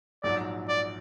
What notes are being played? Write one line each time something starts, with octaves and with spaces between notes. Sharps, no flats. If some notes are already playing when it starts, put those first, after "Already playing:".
A#1 G#2 F#3 D5
D5